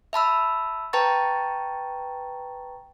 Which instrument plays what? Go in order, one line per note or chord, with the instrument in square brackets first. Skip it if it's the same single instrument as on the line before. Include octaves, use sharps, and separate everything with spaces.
[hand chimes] E5 A5 B5 E6
B4 G5 A5 A#5 C#6 A6